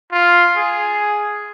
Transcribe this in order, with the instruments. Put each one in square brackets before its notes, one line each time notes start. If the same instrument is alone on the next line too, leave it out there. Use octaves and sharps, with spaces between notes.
[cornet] F4
G#4